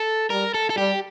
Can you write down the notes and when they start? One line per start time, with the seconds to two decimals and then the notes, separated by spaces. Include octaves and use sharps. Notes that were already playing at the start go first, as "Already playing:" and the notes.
Already playing: A4
0.30 G3 A#4
0.54 A4
0.70 A4
0.77 G3 G4